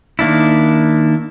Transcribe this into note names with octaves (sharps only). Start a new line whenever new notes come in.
D#3 A#3 D4 E4